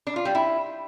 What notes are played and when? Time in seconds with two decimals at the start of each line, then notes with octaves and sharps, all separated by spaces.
0.07 D4
0.16 F4
0.25 G3
0.35 E4